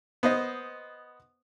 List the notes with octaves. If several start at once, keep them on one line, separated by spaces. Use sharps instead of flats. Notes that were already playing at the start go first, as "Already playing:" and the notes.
B3 C5 D#5